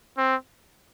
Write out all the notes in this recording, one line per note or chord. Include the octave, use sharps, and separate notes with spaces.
C4